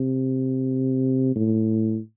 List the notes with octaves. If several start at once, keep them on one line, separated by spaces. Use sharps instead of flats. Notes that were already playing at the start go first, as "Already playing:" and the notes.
Already playing: C3
A2